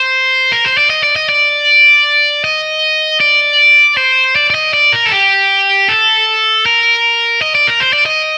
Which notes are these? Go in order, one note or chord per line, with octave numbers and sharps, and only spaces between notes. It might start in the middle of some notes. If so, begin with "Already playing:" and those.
Already playing: C5
A#4
C5
D5
D#5
D5
D#5
D5
D#5
D5
C5
D5
D5
D#5
D5
A#4
A4
G4
A4
A#4
D#5
D5
A#4
C5
D5
D#5